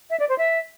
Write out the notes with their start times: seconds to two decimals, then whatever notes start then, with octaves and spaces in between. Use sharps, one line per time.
0.10 E5
0.20 D5
0.29 C5
0.38 E5